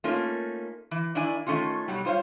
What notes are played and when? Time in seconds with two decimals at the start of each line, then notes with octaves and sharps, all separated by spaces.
0.04 A3 A#3 C#4 D#4 F4 A#4
0.91 E3
1.15 D#3 D4 E4 D5 G#5
1.47 D#3 A3 C#4 D#4 F4
1.88 B2 F#3 G3
2.05 G3 F4 C5 C#5 F5